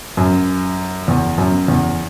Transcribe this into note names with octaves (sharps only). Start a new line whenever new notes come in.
F#2
E2
F#2
E2